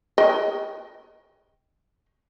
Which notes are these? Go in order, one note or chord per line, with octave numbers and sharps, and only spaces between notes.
D#5 G5